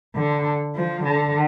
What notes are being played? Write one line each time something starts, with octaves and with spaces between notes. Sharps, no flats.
D3
F3
D3